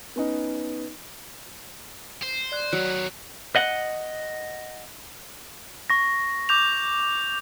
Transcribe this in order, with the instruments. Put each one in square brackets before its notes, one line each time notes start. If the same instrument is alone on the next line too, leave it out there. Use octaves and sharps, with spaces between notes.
[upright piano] B3 C#4 D#4
[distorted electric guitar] C5
[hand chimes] D5 F#6
[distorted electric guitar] D#3 B3 [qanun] F#3 [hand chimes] F#6
[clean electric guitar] D#5 F#5
[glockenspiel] C#6 A#6
[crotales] D6 G6 F7